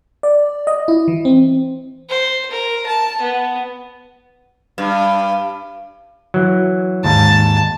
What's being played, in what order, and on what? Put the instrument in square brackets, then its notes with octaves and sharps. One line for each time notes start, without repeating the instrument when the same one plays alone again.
[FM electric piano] D5
D#5
E4
E3
C4
[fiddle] C5
A#4
A5
B3
[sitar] G2
[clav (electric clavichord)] E3 F#3
[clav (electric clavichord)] D#2 G#2 [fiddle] A5